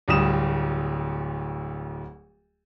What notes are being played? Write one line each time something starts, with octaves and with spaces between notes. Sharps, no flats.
D1 D2 G3 D#6 E7